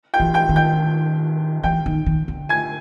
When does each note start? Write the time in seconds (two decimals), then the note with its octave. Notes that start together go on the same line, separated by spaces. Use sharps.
0.14 G5 G6
0.20 E3
0.34 G5 G6
0.49 D#3
0.56 G5 G6
1.63 E3 G5 G6
1.86 D#3
2.06 D#3
2.28 D3
2.49 G#5 G#6